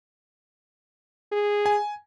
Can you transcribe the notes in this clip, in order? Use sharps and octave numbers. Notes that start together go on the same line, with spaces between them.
G#4
G#5